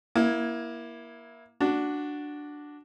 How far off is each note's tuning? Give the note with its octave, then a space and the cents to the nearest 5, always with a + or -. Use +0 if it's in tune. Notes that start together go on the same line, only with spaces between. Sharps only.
A#3 +25 E4 +0
D4 +0 F#4 +0